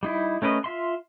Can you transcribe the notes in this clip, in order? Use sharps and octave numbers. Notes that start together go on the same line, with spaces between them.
G3 D#4 E4
A3 C#4 A#4 B4 D#5
F4 E5 C6